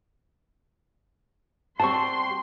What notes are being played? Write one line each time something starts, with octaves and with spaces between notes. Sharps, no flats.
G3 C4 F#4 A5 C6 C#6